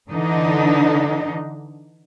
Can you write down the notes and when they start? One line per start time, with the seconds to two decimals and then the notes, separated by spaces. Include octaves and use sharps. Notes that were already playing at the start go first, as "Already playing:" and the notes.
0.11 D3 E3 D4 D#4